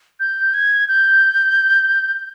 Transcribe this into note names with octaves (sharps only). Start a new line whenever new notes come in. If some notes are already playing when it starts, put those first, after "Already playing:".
G6
G#6
G6